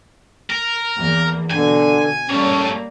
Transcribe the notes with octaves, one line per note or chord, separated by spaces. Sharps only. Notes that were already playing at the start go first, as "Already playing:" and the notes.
A#4
E2 A#3
B2 D3 G#5
G3 A#3 C#4 A4 C#5